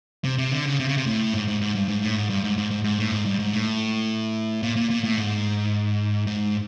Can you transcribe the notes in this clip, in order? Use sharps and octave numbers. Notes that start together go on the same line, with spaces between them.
C3
C3
D3
C#3
C3
C#3
C3
A2
G#2
G#2
G#2
G2
G#2
A2
G#2
G2
G#2
G#2
G#2
G#2
A2
G#2
G2
G#2
A2
A#2
A#2
A#2
A2
G#2
G#2